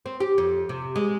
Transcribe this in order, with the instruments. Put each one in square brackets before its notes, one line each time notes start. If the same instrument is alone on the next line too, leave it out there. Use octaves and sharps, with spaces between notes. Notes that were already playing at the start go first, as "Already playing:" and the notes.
[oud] C4
G4
F2
C3
G#3